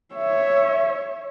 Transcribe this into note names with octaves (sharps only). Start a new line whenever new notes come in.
C#5 E5